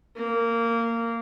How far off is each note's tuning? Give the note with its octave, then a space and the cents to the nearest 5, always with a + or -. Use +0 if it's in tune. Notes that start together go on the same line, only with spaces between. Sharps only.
A#3 -15